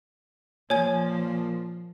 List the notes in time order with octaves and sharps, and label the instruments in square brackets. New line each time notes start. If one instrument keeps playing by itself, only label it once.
[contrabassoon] A#2 [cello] F3 [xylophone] C#5 G#5 G#6